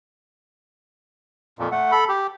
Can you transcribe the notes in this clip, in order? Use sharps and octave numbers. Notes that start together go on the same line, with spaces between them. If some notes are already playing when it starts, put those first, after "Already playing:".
F2 A#2
A3 F#5
A4 B5
G4